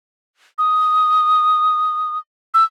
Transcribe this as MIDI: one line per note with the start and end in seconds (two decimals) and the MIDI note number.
0.58 2.18 87
2.54 2.64 88